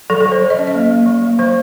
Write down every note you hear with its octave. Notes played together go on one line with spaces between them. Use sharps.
F#3 A4
A4
F#3
C5
F#3
D#5
C#4
D#5
A#3
A#3
F#3
A#3
F#3 C5